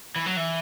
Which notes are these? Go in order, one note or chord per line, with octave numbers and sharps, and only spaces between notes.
E3
F#3
E3